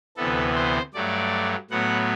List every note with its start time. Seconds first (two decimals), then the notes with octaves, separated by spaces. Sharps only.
0.17 D2 C3 E3 B3 A4
0.55 C5
0.94 G2 F#3 A3 D5
1.70 A2 F#3 B3 F#5